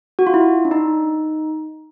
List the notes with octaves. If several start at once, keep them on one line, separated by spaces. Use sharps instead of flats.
F#4
F4
E4
D4
D#4